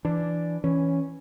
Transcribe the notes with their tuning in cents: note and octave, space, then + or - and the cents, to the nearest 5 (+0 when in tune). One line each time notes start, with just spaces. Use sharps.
E3 +20 D4 +0
E3 +0 C#4 +0